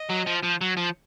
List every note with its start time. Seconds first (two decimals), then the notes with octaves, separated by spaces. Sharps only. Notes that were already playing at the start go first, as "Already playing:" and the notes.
Already playing: D#5
0.10 F#3
0.27 F3
0.43 F3
0.61 F#3
0.77 F3